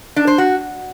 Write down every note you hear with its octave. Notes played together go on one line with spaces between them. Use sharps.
D4
C5
F#4